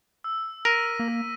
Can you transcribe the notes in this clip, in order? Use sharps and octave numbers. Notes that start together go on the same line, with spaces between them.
E6
A#4 A#6 B6 D#7
A#3